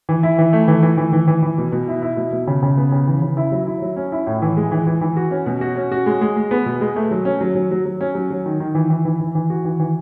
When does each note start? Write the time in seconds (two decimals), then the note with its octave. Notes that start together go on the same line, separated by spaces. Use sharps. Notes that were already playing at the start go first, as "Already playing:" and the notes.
0.09 E3
0.23 E4
0.38 E3
0.53 A3
0.68 E3
0.83 E3
0.98 E3
1.13 E3
1.28 E3
1.43 E3
1.58 B2
1.72 B2
1.88 E4
2.02 E4
2.17 B2
2.32 B2
2.47 C#3
2.63 C#3
2.77 B3
2.92 C#3
3.07 E3
3.22 C#3
3.37 E4
3.52 F#3
3.67 E4
3.82 F#3
3.97 C#4
4.12 E4
4.27 A2
4.42 E3
4.57 G#3
4.72 E3
4.87 E3
5.01 E3
5.17 F#4
5.31 C#4
5.46 B2
5.61 F#4
5.76 C#4
5.92 F#4
6.06 G#3
6.21 G#3
6.37 G#3
6.51 B3
6.66 B2
6.81 G#3
6.96 A3
7.11 F#3
7.25 C#4
7.41 F#3
7.55 F#3
7.71 F#3
7.86 F#3
8.01 C#4
8.15 F#3
8.30 F#3
8.46 D#3
8.60 D#3
8.75 E3
8.90 E3
9.05 E3
9.20 E3
9.35 E3
9.50 F#4
9.65 E3
9.80 E3